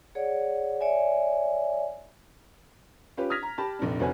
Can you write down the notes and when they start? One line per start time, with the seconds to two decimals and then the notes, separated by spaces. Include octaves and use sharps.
0.15 G#4 C#5 D5 F#5
0.81 C#5 D5 E5 G#5
3.17 C#4 F4 G4 B4
3.30 D#6 F6 G#6 A#6 B6 F7
3.43 A#5
3.58 G4 A5 B5
3.79 F1 A#1 C3 D4
3.99 F1 F2 F#4 B4 C#5 G#5